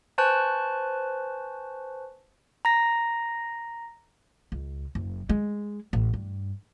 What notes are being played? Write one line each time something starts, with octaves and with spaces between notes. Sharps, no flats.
B4 C5 G#5 A5 C#6 F#6
A#5 A#6
C#2
F#1
G#3
A1
G2